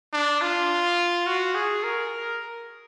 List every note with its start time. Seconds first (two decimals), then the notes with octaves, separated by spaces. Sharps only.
0.13 D4
0.42 F4
1.27 F#4
1.55 G#4
1.84 A#4